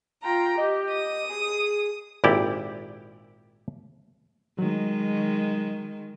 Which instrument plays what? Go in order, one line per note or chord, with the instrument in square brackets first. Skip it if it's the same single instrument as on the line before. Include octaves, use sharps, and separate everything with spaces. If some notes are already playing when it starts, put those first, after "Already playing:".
[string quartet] F4 G5 A#5
[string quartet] G4 [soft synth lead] D#5
[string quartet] D#6
[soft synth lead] G#4
[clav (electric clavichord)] G#1 A#2 E4 G4 D5
[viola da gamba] D#3 G#3 [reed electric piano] F#3